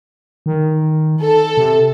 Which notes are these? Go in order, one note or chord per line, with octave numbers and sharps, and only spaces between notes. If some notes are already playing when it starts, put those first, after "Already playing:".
D#3
A4
C3